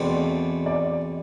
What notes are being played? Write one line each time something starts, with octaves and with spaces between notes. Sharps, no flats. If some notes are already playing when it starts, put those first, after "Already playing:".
Already playing: E2 B2 A3 C4 D5
D5